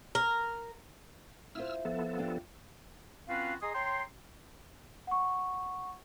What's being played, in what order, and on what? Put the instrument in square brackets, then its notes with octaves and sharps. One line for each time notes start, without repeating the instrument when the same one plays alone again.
[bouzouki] A#4
[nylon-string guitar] E4 F4 C5 [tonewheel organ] E6 F6
[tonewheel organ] F3 B3 A4
[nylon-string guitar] D4 F4 G4
[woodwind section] C4 C#4 F4 F#4 B4 F5
G#4 D#5 G#5 A#5 C6 D#6
C#5 G5 A#5 C6
[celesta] F#5 C#6